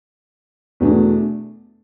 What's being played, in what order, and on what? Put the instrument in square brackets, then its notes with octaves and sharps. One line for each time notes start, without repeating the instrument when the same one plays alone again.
[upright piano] E2 B2 A3 D4